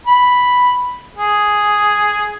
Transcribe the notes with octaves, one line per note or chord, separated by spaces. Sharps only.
B5
G#4